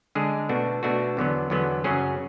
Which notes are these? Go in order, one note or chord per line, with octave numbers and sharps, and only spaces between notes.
D3 G#3 D4 G#4
B2 A3 D4 F#4
B2 A3 D4 F#4
E2 D3 F#3 B3
E2 D3 F#3 B3
F#2 C#3 F#3 C#4 G#4